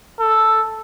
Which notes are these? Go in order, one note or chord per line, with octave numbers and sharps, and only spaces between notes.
A4